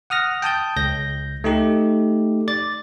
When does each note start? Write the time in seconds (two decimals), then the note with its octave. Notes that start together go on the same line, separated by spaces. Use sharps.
0.10 F#5 D#6 F6 A#6
0.42 G5 A5 D#6 G6
0.76 C#2 G6 A#6
1.44 A3 D#4 G4
2.48 D5 A6